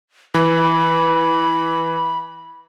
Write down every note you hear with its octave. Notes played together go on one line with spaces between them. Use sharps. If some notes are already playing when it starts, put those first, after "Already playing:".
E3 B5